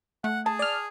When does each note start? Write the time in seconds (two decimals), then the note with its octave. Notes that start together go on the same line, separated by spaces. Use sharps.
0.24 A3 F#5
0.46 G#4 A5
0.59 D5 F6